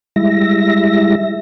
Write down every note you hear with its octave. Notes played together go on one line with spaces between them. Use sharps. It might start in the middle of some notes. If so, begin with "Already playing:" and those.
G3 G#3 E4 E5 A#6